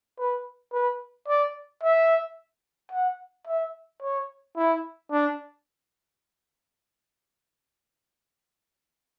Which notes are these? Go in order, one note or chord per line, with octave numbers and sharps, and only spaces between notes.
B4
B4
D5
E5
F#5
E5
C#5
E4
D4